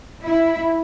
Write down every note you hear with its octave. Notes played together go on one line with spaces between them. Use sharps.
E4